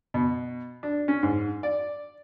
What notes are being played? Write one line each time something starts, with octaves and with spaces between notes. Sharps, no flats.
B2
D4
C#4
G#2
D5